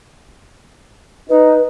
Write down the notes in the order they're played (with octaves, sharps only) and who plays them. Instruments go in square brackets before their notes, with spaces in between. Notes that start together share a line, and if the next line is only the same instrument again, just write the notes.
[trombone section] D#4 [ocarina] B4